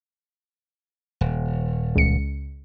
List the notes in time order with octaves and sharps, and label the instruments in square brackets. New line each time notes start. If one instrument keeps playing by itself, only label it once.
[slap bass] D#1
[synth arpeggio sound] C#2 C#7